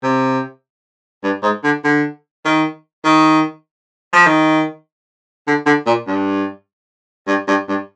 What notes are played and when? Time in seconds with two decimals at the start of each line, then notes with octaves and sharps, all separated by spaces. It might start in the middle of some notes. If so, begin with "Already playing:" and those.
0.03 C3
1.24 G2
1.43 G#2
1.64 D3
1.84 D3
2.45 D#3
3.05 D#3
4.13 F3
4.26 D#3
5.47 D3
5.66 D3
5.86 A#2
6.07 G2
7.27 G2
7.48 G2
7.69 G2